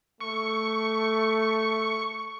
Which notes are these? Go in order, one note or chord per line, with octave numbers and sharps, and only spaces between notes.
A3 C#6